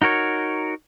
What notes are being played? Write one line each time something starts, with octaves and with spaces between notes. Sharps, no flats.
D#4 F#4 A#4 C#5